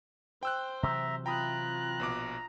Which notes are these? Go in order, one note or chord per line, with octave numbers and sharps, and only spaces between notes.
C5 G5 E6 F#6
C3 E3 F#3 E5 A#5
F4 G5 A#5 B5 D#6 F#6
A#1 B2 D6